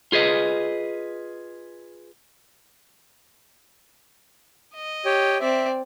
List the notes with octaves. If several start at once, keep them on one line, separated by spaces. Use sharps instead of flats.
F4 G#4 B4 D#5
D#5
G4 C#5 G5
C4 D5 E5